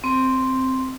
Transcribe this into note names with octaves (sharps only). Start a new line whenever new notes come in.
C4